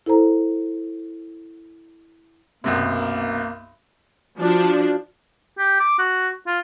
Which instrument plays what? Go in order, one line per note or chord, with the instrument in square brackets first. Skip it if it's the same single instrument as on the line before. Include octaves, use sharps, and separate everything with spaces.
[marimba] E4 A4 C5 A#5
[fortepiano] B1 F#2 C3 [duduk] A#3
[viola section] F3 D4 [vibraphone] F#4 D5
[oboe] G4
D6
F#4
F4